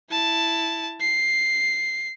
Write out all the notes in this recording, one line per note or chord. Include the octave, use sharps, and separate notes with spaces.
E4 A5
C7